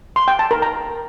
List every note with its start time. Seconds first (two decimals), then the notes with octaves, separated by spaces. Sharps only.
0.16 C6
0.28 G5
0.39 A5
0.51 A#4
0.62 A#5